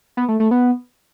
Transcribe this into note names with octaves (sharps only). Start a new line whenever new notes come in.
B3
A3
A3
B3